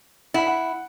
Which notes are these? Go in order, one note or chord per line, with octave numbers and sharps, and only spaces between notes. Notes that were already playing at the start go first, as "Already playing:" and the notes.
E4 F#5 B5
F#5